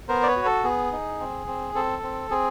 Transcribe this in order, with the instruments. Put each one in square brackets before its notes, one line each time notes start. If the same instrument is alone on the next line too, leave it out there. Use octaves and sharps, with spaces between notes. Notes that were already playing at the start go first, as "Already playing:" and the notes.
[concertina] B3 A#4 C5
D5
B4 C#5
F#4
A4
B3 G#4
D#4
C4
C4
C4 A4
C4
C4 G#4